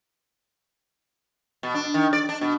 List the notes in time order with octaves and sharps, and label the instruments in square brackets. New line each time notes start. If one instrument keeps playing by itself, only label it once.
[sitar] B2
D4
D#3
D5
D4
B2